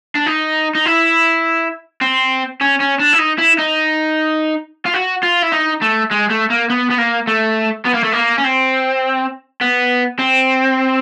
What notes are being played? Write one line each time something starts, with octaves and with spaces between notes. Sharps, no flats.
D4
D#4
D#4
E4
C4
C#4
C#4
D4
E4
D#4
E4
D#4
F4
F#4
F4
E4
D#4
A3
G#3
A3
A#3
B3
B3
A#3
A3
B3
A#3
A3
A#3
C#4
C4
B3
C4